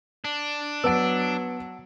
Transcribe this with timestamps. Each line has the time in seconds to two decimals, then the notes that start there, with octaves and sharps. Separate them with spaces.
0.25 D4
0.84 F#3 B3 F#5 A5 E6 D7